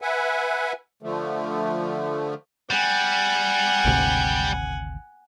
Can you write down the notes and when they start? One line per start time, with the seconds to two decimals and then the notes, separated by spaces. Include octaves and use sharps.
0.02 B4 E5 F#5 G#5
1.02 D3 F3 A3
2.71 G3 F#5 G#5
3.85 G#1 D2 C3